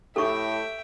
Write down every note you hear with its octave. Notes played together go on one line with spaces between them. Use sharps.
A2 G4 A4 E5 G5 C#6